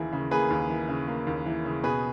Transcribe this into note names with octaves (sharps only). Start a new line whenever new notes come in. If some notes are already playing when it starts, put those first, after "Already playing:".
Already playing: D#2 C#3 E3 A#3 G#4
C#3
A#3 G#4 B4
D#2
E3
C#3
A#3
D#2
E3
C#3
B2 G#4 B4